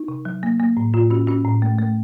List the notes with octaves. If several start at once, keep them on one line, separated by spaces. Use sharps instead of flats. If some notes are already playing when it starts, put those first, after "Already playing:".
Already playing: D#4
C3
F#3
A#3
A#3
A2
A2 F4
C#4 F#4
C#4 F#4
A2
A3
A3